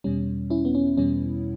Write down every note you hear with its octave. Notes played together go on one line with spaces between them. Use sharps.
E2 B2 G3 C#4
C#4 E4
B3
C#4
E2 B2 G3 C#4